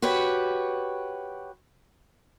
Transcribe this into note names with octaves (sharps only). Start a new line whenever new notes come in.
F#4 G4 B4 C#5